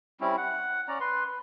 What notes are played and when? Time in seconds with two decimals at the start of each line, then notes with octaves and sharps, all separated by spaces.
0.21 G3 C4 C#4 E4
0.37 F#5
0.88 C#4 D5 A#5
1.00 B4 C6
1.28 B4